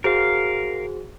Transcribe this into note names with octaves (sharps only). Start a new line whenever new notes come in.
F#4 G#4 A#4 C5 F5